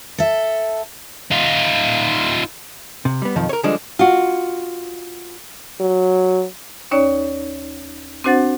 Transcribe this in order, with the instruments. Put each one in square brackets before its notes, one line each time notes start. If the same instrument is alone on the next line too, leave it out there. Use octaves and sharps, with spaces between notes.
[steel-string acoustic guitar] A4 E5
[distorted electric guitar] D#4 F4
[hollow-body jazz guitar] C3
G3 B3
B1 F2 D#3 F3
A#4 C#5
D3 F3 G3 G#3 D4
[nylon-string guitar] F4 F#4
[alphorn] F#3
[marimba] D#2 C#4 D#4 C#5 D5
C4 D4 F#4 C5 F#5 A6